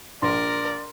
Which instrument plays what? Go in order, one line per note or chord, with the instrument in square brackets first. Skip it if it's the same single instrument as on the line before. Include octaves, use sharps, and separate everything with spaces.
[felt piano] A#1 [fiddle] A#4 [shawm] D5 [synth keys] C6